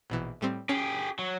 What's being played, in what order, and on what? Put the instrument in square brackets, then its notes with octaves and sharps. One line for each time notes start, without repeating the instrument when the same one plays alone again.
[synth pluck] A#1 B2 E3
A2 G3 C4
[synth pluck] C#4 [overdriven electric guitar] G4 G#4
[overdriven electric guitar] F#3